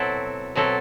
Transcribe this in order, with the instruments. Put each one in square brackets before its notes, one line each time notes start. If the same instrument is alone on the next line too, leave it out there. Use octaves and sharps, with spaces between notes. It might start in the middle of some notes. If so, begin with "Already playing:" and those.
Already playing: [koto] B2 F#3 C4 E4 A4
B2 F#3 C4 E4 A4